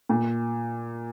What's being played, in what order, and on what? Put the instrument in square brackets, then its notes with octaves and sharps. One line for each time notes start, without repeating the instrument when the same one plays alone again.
[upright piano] A#2